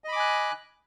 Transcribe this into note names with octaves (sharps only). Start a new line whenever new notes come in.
D#5 G#5 B5 D6 F#6